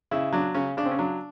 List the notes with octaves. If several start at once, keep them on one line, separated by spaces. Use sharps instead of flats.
C#3 E4
F#3 D4
C#3 C#4
C#3 D4
C4
C#4
F#3 D4